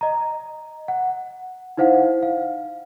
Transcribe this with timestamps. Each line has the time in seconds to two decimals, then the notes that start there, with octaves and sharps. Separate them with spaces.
0.01 D#5 A#5
0.88 F#5
1.77 D#4 E4 C5 F5 F#5
2.23 F5